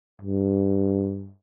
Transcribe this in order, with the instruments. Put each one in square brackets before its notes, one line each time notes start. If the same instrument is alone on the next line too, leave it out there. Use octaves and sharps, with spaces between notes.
[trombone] G2